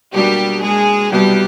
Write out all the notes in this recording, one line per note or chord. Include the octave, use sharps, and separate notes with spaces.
B2 F#3 G3 A#3 D4 F#4 G4
G#3 G#4
C2 B2 F#3 G3 B3 E4 G4